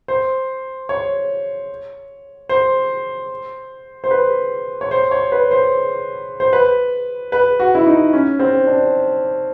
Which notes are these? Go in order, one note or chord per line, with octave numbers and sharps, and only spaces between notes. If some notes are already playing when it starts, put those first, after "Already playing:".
C5
C#5
C5
C5
B4
C#5
C5
C#5
B4
C5
C5
B4
B4
F#4
E4
D#4
C#4
C4
D4